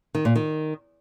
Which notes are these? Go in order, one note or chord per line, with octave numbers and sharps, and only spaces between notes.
D#3
A#2
D#3